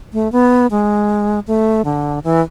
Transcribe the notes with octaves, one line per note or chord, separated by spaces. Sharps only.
A3
B3
G#3
A3
D3
E3